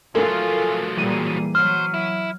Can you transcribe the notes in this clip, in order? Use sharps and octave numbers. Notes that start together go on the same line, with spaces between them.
F3 F#3 A3 F4 A4 A#4 G#5
A#2 E3 G3 G#4 D#7
F#3 C5 F6
E4